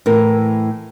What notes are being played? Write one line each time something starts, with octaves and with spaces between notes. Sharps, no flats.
A2 E3 A#4